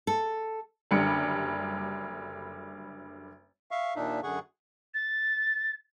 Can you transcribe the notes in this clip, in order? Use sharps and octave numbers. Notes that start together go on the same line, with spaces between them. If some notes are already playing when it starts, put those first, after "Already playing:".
A4
F#1 D3 G3 C#7
E5 F5 C#6
D#2 A#2 D4 D#4 E5
F#2 D3 G#4 F#5 C#6
A6